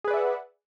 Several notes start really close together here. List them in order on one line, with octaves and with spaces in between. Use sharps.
G#4 B4 D5 E5 F#5